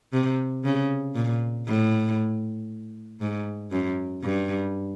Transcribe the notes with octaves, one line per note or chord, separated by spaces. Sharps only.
C3
C#3
A#2
A2
G#2
F#2
G2